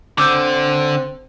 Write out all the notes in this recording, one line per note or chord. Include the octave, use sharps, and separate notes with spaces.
D3 C4 D6 E6 G6